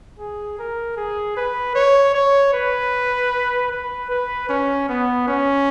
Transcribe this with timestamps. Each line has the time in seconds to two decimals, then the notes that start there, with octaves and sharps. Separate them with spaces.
0.20 G#4
0.59 A#4
0.97 G#4
1.37 B4
1.76 C#5
2.15 C#5
2.54 B4
3.72 B4
4.10 B4
4.49 C#4
4.89 B3
5.28 C#4